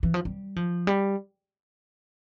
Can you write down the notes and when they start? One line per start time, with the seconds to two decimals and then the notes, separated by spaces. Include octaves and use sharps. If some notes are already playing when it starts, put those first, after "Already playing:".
0.03 E3
0.14 F3
0.25 G3
0.56 F3
0.87 G3